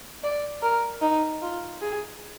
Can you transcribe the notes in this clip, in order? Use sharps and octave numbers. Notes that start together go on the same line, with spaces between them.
D5
A#4
D#4
F4
G#4